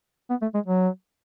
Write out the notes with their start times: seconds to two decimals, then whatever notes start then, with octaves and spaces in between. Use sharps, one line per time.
0.30 B3
0.42 A3
0.54 G#3
0.66 F#3